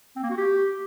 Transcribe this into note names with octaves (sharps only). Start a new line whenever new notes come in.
C4
A#3
F#4
G4